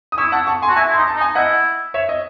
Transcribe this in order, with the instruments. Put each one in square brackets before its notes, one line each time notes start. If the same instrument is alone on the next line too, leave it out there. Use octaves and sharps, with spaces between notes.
[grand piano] D#6
[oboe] E4 [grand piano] C#6 E6
[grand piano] F#5 A5
A5 C#6
G#5 C6
[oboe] F#4 [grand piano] A5
[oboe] E4 [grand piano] E5 G#5
[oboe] E4
[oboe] D#4 [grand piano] C6
[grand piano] A5
[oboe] D#4
[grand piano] G#5
[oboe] E4 [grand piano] D#5 F#5
[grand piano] C#5 E5
D#5